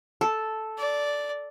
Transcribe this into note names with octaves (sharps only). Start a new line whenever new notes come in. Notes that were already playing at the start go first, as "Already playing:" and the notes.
A4
D5